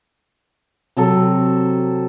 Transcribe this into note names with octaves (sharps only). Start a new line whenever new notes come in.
C3 F#3 A4